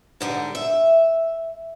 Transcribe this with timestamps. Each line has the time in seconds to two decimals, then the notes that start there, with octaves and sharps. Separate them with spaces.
0.21 G#2 D3 G3
0.55 E5